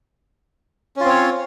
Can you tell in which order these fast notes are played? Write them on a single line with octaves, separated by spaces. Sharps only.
C#4 F4 C4 C#5